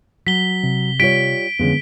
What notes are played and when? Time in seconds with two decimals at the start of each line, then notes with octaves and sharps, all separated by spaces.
0.27 F#3 B6 G7
0.64 C3
1.00 G3 F4 C#5 B6 D7
1.59 F2 D3 G#3 B3 C#4